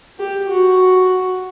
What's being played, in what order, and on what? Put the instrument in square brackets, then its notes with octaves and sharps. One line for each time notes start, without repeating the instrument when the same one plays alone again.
[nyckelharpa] G4
F#4